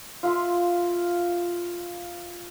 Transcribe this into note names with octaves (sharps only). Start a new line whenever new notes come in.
F4 E5 C6